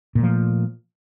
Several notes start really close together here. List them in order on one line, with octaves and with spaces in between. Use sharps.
A#2 A3 F3